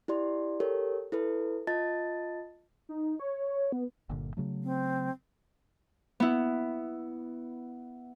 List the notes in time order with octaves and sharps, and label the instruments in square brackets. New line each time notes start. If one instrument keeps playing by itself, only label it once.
[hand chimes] E4 G4 D5 C6
G4 A4 A#4 C#5
E4 A4 B4
F4 D#5 A5 A6
[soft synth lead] D#4
C#5
B3
[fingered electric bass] G1 A#2 D3
C#3 F#3 A3
[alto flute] C4
[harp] B3 E4